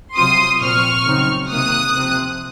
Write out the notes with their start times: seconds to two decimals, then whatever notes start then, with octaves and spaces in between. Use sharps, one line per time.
0.15 C3 F#3 C4 F4 C6 D#6
0.61 A#2 F3 C4 C#6 F6
1.06 C#3 F#3 C4 D#4
1.51 C3 D#3 A#3 D#6 F#6
1.96 C3 F3 C4